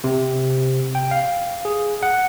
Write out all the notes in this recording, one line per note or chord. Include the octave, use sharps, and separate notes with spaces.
C3
G5
F5
G#4
F#5